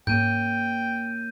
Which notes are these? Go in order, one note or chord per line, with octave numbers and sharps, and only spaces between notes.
G#2 A#3 C#4 G5 G6 D#7